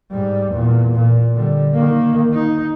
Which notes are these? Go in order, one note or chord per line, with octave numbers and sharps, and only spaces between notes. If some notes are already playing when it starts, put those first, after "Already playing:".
G#2 G3
E2 A#2
A#2
D3 G3
D#3 A#3
D#4